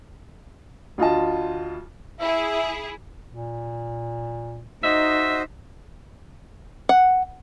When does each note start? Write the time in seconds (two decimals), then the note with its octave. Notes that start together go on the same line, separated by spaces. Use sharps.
0.98 D2 F4 D#5 A5
2.20 E4 G#4 E5
3.28 A#2
4.83 D#4 F#4 C5 D#5 E5
6.89 F#5